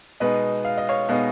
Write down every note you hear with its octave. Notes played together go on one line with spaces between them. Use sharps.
B2 G#3 B3 D#4 B4 D#5
F5
D#5
C#5 F5
B2 G#3 B3 D#4 C#5 F5